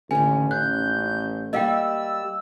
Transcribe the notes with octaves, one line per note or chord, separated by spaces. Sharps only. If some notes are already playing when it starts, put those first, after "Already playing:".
A1 D#2 D3 C#4 G#5
F#6 G6
G3 A#3 D#5 F5 G5 E6